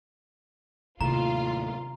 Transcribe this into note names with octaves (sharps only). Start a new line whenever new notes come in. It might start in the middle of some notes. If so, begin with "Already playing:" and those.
D#2 A2 C3 F4 A#5